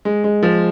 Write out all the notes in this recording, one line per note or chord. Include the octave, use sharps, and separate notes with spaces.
G#3
G#3
F3